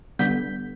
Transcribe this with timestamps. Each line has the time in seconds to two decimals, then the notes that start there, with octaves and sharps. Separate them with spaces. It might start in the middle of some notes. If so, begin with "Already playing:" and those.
0.19 D3 G3 B3 G6 B6